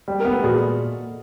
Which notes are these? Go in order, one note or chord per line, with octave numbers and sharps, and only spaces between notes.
G3
B3 A#4
A4
A#2 F#4 G#4